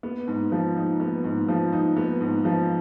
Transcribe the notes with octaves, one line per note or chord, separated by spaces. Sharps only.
B3
G#2
F3
D#4
B3
G#2
F3
D#4
B3
G#2
F3